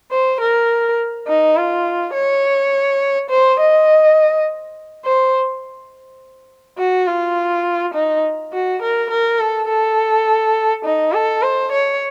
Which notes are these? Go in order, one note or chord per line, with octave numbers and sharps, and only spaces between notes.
C5
A#4
D#4
F4
C#5
C5
D#5
C5
F#4
F4
D#4
F#4
A#4
A#4
A4
A4
D#4
A4
C5
C#5